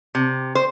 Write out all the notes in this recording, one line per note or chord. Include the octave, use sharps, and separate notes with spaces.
C3
C5